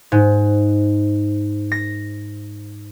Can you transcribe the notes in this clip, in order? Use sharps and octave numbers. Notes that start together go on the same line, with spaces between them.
G#2
A#6